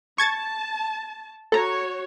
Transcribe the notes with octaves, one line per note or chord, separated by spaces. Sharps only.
A5 C#6 G#6 A6
F#4 A4 C#5 A#5